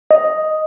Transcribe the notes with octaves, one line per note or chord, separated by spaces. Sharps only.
D#5